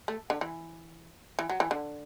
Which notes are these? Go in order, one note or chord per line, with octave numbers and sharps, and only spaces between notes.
A3
D3
E3
E3
F#3
E3
D3